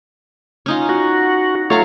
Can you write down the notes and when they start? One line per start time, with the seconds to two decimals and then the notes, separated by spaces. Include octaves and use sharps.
0.66 C#4 D#4 F4
0.89 F4 F#4
1.70 F#3 A3 F4 C#5 F5 A#5